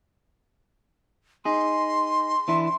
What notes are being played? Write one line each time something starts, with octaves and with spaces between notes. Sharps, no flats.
D#4 G#4 C6
E3 D4 E4